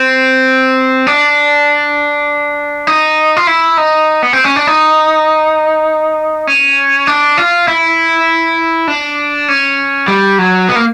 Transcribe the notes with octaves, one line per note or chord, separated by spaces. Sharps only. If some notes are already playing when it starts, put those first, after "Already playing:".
Already playing: C4
D4
D#4
F4
E4
D#4
B3
C4
C#4
D4
D#4
C#4
D4
F4
E4
D4
C#4
G3
F#3
B3
A#3